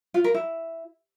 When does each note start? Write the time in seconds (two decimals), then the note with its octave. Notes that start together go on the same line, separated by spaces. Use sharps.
0.14 F4
0.24 A#4
0.34 E4